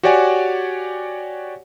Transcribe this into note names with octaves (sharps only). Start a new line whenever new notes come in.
F#4 G4 C#5 D5 F#5 G#5